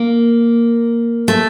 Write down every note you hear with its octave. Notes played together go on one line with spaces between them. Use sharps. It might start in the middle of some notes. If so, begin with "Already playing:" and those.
Already playing: A#3
A3